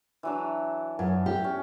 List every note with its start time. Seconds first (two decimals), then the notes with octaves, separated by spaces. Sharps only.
0.23 E3 F#3 D4
0.99 F#2
1.26 G4
1.44 C#4